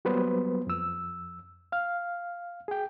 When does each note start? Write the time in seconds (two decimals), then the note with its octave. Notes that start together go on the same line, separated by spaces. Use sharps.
0.05 F#3 G3 A#3 B3 B4 C5
0.67 F2 E6
1.72 F5 F6
2.68 G#4 G5